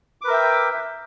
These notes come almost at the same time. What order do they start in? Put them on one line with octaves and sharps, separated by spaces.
D6 B4 A#4 E5 G5